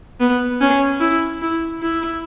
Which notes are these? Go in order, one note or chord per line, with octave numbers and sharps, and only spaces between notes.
B3
C#4
E4
E4
E4